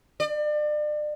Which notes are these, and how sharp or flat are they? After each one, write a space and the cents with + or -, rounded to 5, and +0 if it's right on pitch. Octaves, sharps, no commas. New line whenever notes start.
D5 +35